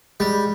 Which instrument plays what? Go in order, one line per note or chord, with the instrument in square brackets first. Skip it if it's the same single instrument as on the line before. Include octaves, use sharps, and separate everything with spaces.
[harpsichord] G3 [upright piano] G#3